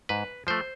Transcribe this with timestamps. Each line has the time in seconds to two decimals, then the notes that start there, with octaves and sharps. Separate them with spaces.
0.09 G#2 B4
0.47 F3 A3 C5